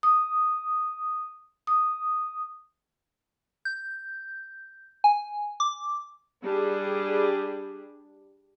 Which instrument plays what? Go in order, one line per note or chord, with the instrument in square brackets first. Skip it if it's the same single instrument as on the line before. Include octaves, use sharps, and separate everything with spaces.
[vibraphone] D#6
D#6
[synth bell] G6
G#5
D6
[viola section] G3 D4 G#4